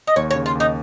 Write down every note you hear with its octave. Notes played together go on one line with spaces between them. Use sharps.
D#5
D#2 C#5
C#5
C#3
F4
D#2 D#4